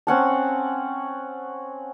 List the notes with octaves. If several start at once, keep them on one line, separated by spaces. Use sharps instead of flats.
C4 C#4 F#5 A5